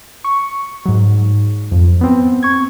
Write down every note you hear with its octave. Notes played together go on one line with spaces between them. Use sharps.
C#6
G#2 F#3
F2
B3 C4
C#6 G#6